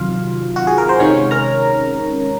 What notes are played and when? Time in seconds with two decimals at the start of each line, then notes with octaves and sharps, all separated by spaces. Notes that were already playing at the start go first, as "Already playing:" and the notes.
Already playing: C3 D#3 F#3 F4 F5
0.56 F#4
0.67 G#4
0.78 A#4
0.89 C5
0.99 C3 D#3 G#3 C#4 C#5
1.31 A#4 A#5